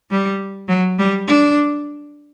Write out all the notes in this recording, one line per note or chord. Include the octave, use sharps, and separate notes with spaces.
G3
F#3
G3
D4